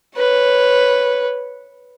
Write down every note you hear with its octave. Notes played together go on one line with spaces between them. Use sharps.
B4 C#5